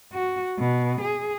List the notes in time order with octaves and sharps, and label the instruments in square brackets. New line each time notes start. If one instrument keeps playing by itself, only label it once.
[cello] F#4
B2
G#4